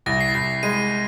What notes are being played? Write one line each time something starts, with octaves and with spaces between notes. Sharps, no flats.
C2 A#6
C7
C2 C7
G#3 D#7